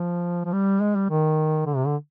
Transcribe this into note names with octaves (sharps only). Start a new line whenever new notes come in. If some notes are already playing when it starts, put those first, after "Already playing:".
Already playing: F3
F3
G3
G#3
G3
D#3
D3
C3
D3